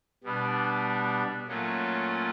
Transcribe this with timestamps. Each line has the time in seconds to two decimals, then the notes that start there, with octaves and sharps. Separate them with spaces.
0.24 B2 G3 B3 D4
1.48 A#2 F#3 A3 C#4 F4